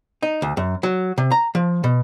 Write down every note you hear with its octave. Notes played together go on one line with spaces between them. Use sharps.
D#4
D2
F#2
F#3
C3
A#5
F3
B2